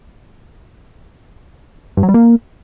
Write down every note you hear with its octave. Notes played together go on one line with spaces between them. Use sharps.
G2
F#3
G3
A#3